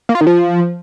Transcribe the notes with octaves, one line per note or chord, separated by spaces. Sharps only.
A#3
F4
D#3
F3